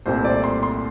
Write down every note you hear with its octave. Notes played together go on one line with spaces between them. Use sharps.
C2 A#2 A3 C4 C5
D5
C6
C6